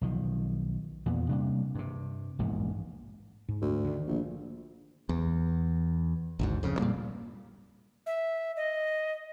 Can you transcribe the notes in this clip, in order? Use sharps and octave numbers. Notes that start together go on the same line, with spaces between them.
B1 D#3 F3
E2 A#2 B3
C3 G3 A#3 D4
G2 C3
E1 A#1 G#2 B2
G#2
D2
D3 D#3
A#1
E2
G#1 D2 G#2
F2 C#3
A#2 G3 A#3
E5
D#5